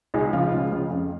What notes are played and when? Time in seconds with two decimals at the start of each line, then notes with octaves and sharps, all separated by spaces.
0.14 C#2 D#4 G#4
0.33 C#3 F3 F4
0.52 C#2
0.71 C#3 F3
0.90 F2